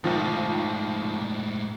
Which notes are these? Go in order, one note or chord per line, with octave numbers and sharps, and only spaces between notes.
B1 G#2 D#3 F3 A3